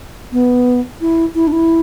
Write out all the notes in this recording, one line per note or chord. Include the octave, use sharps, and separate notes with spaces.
B3
E4
E4
D4
E4